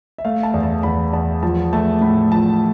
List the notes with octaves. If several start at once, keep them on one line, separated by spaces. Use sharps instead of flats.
E5
A3 F5
A5
E2
A5
E2 B5
E2 A5
F3 A5
A3 A5
A2 B5
F3 A5